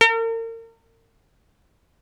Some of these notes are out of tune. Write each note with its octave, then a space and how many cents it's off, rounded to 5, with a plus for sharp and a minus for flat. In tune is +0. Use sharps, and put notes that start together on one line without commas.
A#4 -40